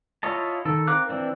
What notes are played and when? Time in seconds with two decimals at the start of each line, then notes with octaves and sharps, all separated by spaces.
0.23 E4 F4 C#5 D#5 A5
0.65 D#3 A4
0.87 C4 A#4 F5 D6 F#6
1.09 E3 C4 D4